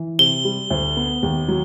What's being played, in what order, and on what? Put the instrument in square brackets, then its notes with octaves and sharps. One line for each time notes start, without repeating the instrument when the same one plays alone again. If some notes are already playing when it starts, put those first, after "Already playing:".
Already playing: [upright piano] E3
[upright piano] C3 [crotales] G7
[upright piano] G3
D2
B3
D#2
F#3